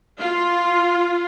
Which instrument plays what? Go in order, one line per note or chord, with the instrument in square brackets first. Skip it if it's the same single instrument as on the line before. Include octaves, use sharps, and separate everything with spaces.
[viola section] F4